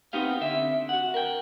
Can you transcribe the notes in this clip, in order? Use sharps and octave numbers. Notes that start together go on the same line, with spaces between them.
B3 C4 D#4 G4 F5
D3 C4 E5
F#4 F#5
A#4 G5